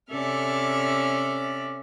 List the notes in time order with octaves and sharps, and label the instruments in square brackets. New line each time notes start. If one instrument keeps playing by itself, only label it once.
[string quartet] C3 C#4 A4 D5 E5 F6